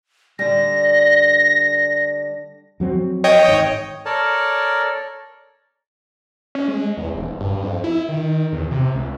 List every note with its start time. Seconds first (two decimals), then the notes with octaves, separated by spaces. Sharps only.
0.39 D3 G3 A#6
2.80 F2 F#3 C4
3.24 C#5 D#5 G5
3.48 G#1 G#2
4.06 A4 A#4 C#5 D5 A5
6.55 C#4
6.68 G#3
6.97 E2
7.14 D#1
7.41 G2
7.63 F2
7.84 E4
8.09 D#3
8.53 E2
8.71 C3
8.95 C#2